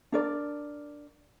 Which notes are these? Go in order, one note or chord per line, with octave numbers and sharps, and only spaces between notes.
D4 A#4 D5